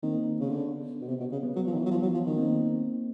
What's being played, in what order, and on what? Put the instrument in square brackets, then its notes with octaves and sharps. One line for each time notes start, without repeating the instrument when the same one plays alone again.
[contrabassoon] D#3 [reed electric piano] A#3 C4
[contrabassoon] C#3
[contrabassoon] D3 [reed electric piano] B3
[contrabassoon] B2
C3
B2
C#3
[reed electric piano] B3
[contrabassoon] F#3
F3
D#3
E3
F#3
F3
F#3
F3
D#3
[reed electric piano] A#3 C4